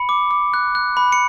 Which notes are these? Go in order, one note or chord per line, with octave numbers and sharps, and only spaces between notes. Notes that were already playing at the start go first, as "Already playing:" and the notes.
Already playing: B5 C#7
D6
D6
F#6
F#6
B5
C#7